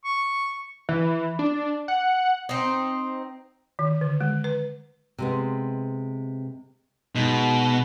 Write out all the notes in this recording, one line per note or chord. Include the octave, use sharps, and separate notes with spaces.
C#6
E3
D4
F#5
C4 D#4
D#3
D3
G#3
B4
C3 G#3 B3
B2 G#3 D#4